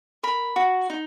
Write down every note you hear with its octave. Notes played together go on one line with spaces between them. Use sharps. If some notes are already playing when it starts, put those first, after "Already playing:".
A#4 B5
F#4
D#4